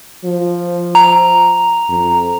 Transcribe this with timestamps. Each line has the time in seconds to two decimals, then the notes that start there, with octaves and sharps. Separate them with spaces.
0.25 F3
0.95 A#5
1.89 F2